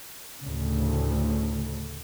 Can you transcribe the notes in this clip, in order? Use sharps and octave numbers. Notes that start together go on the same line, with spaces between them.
D2 A2 C#3